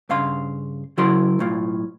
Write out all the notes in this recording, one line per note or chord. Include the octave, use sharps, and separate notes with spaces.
G2 C#3 F5 C6
C#3 F#3 E4 F#4 A#4 C6
B1 A2 F4